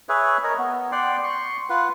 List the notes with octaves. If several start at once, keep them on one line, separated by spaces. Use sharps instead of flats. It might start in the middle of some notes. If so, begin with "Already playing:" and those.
G#4 B4 C#5 E5
A#4 C#5 D#5
B3
D5 F#5 G5 C6
C6 C#6
F4 B4 F#5